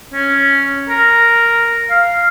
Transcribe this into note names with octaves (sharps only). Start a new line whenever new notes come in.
C#4
A#4
F5